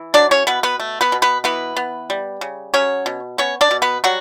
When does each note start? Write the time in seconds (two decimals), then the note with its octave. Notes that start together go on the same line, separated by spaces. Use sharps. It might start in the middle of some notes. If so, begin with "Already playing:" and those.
Already playing: E3
0.14 F#3 D4 D5
0.31 C#4 C#5
0.47 B2 B3 B4
0.63 B3 B4
0.80 A3
1.01 B3 B4
1.12 B2
1.22 B3 B4
1.44 E3 B3 B4
1.77 B3
2.10 G3
2.41 C#3
2.74 F#3 C#4 C#5
3.06 B2
3.38 B3 C#4 C#5
3.61 D4 D5
3.71 B2
3.82 B3 B4
4.04 F#3 G3 F#4